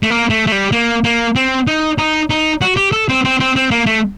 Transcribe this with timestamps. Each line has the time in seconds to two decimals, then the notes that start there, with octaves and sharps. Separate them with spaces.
0.03 A3
0.10 A#3
0.30 A3
0.47 A3
0.52 G3
0.72 A#3
1.04 A#3
1.35 C4
1.67 D#4
1.98 D#4
2.30 D#4
2.61 F#4
2.76 G4
2.92 A4
3.09 C4
3.25 C4
3.40 C4
3.56 C4
3.71 A#3
3.86 A3